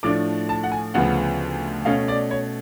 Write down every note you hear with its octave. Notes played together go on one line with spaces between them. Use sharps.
A2 F3 A3 D4 D6
A5
F#5
G#5
D2 C#3 F3 B3 F#5
B2 A3 C#4 F5
D5
C#5